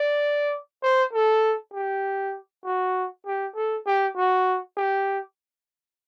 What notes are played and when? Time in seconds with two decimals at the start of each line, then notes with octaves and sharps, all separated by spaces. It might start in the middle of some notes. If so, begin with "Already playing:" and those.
Already playing: D5
0.83 C5
1.13 A4
1.74 G4
2.64 F#4
3.26 G4
3.56 A4
3.86 G4
4.17 F#4
4.77 G4